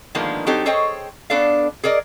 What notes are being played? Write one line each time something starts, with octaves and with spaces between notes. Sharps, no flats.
D3 D#3 F3 G#3 A#3 B3
F#3 C4 D#4 G4 A4
G#4 A4 C5 C#5 D#5 G5
B3 D4 A4 D5 F5
G#4 A#4 D5 D#5